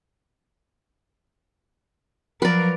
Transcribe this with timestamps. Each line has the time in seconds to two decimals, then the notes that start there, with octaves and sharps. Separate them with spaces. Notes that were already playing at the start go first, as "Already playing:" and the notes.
2.42 F3 F#3 A#4 B4 D5